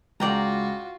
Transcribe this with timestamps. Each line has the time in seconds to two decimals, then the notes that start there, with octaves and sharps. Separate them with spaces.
0.20 C#2 F4 F#4 D5 G5 A#5